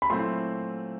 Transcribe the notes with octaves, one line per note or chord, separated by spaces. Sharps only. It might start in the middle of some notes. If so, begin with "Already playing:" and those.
B5
A#2 F#3 A3 C4 E4 C6